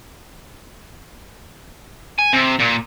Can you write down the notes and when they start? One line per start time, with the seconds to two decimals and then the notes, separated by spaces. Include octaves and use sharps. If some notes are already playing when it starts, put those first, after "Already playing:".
2.19 G#5
2.33 C3
2.60 A#2